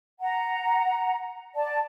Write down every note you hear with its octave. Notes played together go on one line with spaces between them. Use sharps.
F#5 A#5
D5 A5